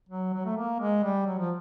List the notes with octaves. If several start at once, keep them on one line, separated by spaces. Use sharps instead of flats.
F#3
F#3
A3
A#3
G#3
G3
F#3
F3